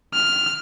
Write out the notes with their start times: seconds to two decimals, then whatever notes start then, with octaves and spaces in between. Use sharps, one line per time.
0.14 F6